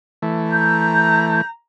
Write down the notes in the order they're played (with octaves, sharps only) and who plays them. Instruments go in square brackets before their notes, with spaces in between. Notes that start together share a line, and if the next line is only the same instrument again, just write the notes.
[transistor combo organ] E3 A3
[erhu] A#5 [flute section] G6